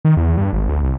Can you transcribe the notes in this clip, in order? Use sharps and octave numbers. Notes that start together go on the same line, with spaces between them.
D#3
E2
G2
G#1
D2
C2